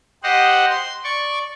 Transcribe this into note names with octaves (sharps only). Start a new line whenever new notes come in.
G4 C5 D#5 F#5
C6
D5 C#6